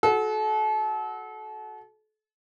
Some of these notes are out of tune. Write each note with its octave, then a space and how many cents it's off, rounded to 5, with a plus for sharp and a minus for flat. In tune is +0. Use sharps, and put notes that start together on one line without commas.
F#4 +0 A4 -35